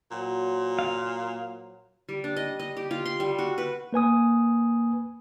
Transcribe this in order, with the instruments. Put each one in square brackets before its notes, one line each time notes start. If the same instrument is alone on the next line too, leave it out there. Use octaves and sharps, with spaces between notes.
[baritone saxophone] A#2 [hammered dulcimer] F#3 C5
[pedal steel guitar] F5
[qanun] G3
D4
D#5
D#5
G4
F4
C6
G3
F#4
B4
[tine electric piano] A#3 B4 G#5 D#6